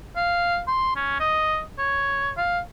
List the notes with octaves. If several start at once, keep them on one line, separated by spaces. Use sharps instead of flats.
F5
C6
C#4
D#5
C#5
F5